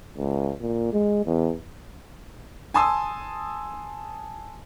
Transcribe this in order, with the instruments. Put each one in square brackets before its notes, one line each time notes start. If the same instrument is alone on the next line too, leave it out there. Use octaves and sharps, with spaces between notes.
[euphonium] C#2
A#2
G#3
E2
[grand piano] G#5 A5 C6 D#6 E6